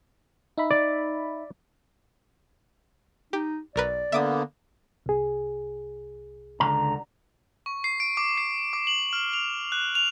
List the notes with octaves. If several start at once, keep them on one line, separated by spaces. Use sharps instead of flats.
D#4 E5 B5
D5
D#4 G4
B1 A#4 B4 D5
D3 A#3 B3 E5 D6 D#6
C2 G#4
C#2 D3 A#5
C#6
C7
D7
D6
C7
D6
F#7
F6
F7
F#6
F7